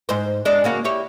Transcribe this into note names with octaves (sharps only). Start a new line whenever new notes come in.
G#2 C5
G#3 D4
C#3 A#3 F#4
E4 G4 C#5